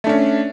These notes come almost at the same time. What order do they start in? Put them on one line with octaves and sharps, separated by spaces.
A3 D4 C#4